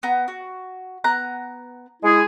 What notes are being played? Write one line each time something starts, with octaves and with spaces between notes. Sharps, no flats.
B3 A#5
F#4
B3 A#5 F#6
G#3 E4 G#4